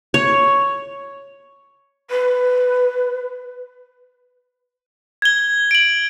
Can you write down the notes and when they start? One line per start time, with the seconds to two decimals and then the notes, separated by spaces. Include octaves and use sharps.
0.14 C#5
2.10 B4
5.22 G#6 G7
5.71 D7 F#7